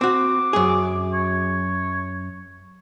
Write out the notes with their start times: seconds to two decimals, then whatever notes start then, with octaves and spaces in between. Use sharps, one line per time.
0.01 C4 F#4 D6
0.53 F#2 G#4
1.13 C#5